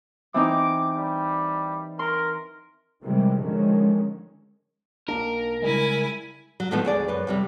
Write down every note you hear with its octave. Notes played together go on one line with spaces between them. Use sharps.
E3 C4 D#4 D6
G3
A#4 C6
C3 D#3 E3 G3 G#3
G#2 D3 D#3 F3 G#3 C#4
B1 A#3 D4 A#4
C#3 G3 G#3 E4 G#5
F#3
A2 D3 D#3 F3 A3 B3
D2 G#4 D5
F#2 B4
F2 C3 G3